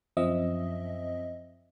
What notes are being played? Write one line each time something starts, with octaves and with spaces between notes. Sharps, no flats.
F#2 F3 C4 D#5 E5